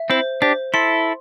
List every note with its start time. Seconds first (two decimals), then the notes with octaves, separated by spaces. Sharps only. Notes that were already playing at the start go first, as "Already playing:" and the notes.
Already playing: E5
0.10 C4 E4 C5
0.42 D4 G4 C5
0.74 E4 A4 C6